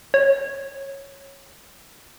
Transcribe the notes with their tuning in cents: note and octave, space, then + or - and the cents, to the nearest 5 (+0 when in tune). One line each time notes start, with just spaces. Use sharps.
C#5 -15